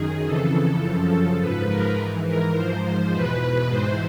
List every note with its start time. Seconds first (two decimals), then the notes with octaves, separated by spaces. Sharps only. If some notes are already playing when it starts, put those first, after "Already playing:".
Already playing: F#2 D#3 G#4
0.26 F2 C#3 E3 A4
0.83 F#2 C#3 F3 A4
1.40 G#2 F3 B4
1.68 A#4
1.98 G#2 E3
2.27 A#4
2.55 G#2 F3 C5
3.12 E2 B2 B4
3.69 G#2 E3 C5